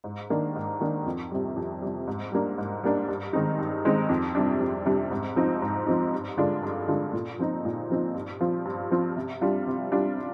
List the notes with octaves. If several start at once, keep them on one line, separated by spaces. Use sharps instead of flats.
G#2
D#3 A#3 D4
G#2
D#3 A#3 D4
F2
C3 G3
F2
C3 G3
G#2
G3 A#3 D4
G#2
G3 A#3 D4
G2
D#3 G#3 C4 D#4
G2
D#3 G#3 C4 D#4
F2
C3 G3 D4
F2
C3 G3 D4
G#2
F3 C4 D#4
G#2
F3 C4 D#4
G2
D3 G#3 D4 F4
G2
D3 G#3 D4 F4
A#2
F3 C4 D#4
A#2
F3 C4 D#4
G2
F3 C4 F4
G2
F3 C4 F4
C3
G3 D4 F4
C3
G3 D4 F4